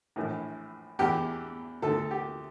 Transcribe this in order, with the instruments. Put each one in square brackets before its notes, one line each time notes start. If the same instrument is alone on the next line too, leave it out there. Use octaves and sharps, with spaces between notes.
[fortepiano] A#1 A2 E3
E2 E3 G4
D2 D3 A4
G4